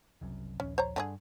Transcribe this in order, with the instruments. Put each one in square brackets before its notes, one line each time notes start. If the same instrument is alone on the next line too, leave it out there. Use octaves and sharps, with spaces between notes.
[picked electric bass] F#1 C2 F#2
[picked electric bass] D#1 A#1 [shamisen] C#4
[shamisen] C5 C#5 A#5
[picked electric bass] G2 [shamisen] D3 C#4 G#4